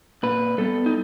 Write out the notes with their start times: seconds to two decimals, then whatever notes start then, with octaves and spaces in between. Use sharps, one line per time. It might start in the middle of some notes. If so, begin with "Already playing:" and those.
0.23 A#2 B4
0.58 G3 B3 A4
0.86 D#4